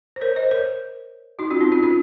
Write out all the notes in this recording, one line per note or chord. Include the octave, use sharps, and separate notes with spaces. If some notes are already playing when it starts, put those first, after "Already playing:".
C5
A#4 C#5
C5 D#5
A#4 C#5
D#4 F#4
C#4 F4
C4 D#4
C#4 F4
C#4 F4